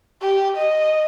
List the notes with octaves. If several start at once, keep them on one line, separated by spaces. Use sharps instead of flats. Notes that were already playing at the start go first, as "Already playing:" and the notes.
G4
D#5